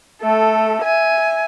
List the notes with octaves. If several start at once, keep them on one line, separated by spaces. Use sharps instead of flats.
A3 A4
E5 G#5